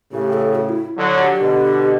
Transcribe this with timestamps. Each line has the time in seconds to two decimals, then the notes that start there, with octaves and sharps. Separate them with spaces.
0.12 A2 C#3 G4
0.33 A4
0.55 F#4
0.69 E4
0.98 D3 F#3
1.20 G4
1.40 B2 D3